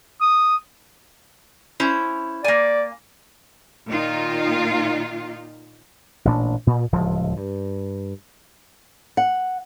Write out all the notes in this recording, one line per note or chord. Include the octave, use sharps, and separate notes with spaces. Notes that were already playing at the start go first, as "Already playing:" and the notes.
D#6
C#4 E4 C5
A#3 D5 G#5
A#2 D#3 D#4 F4
A1 A#2 D4
A#2
D1 C#2 F3
G2
F#5